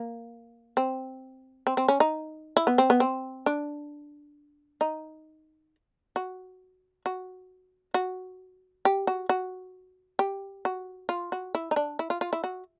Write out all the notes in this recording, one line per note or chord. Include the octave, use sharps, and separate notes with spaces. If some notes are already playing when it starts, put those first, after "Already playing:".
Already playing: A#3
C4
C4
C4
C#4
D#4
E4
B3
C4
B3
C4
D4
D#4
F#4
F#4
F#4
G4
F#4
F#4
G4
F#4
F4
F#4
E4
D#4
D4
E4
F4
F4
E4
F#4